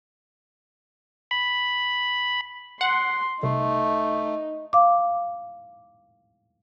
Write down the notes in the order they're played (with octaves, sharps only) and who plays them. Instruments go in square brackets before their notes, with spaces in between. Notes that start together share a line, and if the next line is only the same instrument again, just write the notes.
[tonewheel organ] B5
[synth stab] F#5 [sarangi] C6
[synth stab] C2 [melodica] A3 [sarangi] D#4
[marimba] F5 D6